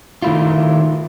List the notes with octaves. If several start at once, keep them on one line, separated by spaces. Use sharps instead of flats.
D#3 A3 E4 F4